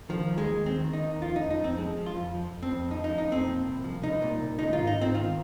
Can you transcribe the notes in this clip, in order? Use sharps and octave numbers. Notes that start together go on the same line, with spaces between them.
D#3 F3
D#2
G#3
D#2
D#3 C4
D#3
D#4
D#2
F3 F4
F2 D#4
D#4
F2 C4
F3 G#3
F3
F4
F2
F3
F2
C4
F2
F3 D#4
D#4
F3
D#4
F2 C4
A#2
C2
F3
C2 D#4
A#2
C2
D#3 D#4
F4
G#2
D#4
G#2 C4
D#3 F4